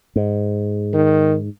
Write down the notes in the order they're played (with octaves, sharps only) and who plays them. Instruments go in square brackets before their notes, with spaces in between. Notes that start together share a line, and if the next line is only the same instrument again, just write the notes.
[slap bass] G#2
[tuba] D#3